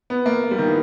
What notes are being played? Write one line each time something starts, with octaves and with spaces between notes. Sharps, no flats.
B3
A#3
G3
D#3
E3